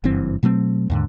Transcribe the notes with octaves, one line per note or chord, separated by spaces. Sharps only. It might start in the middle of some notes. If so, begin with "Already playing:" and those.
F#1 G2 E3 C4
B2 F#3 A3 C4
D#2 G#2 D3